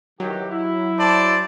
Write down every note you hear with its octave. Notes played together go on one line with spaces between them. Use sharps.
D#3 E3 F#3 G4
E4
C5 D5 A5